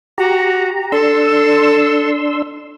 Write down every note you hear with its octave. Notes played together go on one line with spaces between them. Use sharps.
F#4 G4 A#5
D4 A4 C6 E6